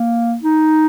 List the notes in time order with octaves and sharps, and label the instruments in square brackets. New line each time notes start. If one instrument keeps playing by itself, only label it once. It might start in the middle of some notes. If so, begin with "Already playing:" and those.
Already playing: [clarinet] A#3
D#4